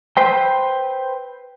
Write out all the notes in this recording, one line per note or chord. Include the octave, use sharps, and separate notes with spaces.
B4 C5 G5